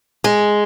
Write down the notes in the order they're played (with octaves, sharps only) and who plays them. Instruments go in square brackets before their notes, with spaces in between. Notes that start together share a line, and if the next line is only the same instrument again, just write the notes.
[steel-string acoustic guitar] G#3